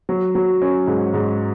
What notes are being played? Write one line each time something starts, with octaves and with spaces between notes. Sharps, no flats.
F#3
F#3
C#4
G#2
G#2